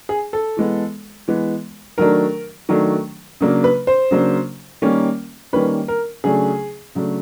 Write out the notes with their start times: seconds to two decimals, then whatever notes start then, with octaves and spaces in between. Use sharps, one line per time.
0.09 G#4
0.33 A4
0.57 E3 G#3 B3
1.28 E3 G#3 B3
1.98 D#3 F#3 A3 D4 A#4
2.69 D#3 F#3 A3 D4
3.41 C#3 F#3 A#3 D4
3.64 B4
3.87 C5
4.11 C#3 F#3 A#3 D4
4.82 D#3 G3 A#3 C#4
5.53 D#3 G3 A#3 C#4 B4
5.88 A#4
6.24 C#3 F#3 A3 D4 G#4
6.95 C#3 F#3 A3 D4